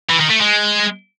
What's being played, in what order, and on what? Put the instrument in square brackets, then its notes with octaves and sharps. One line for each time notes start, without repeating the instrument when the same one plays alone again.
[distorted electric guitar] E3
D#3
A3
G#3